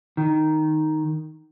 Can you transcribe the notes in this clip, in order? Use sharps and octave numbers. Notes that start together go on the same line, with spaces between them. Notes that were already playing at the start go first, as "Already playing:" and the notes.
D#3